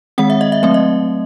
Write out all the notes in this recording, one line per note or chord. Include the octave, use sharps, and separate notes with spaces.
D#3 G#3 C4 F#5
E5
D#5
E5
F#3 A3 C4 E5
D#5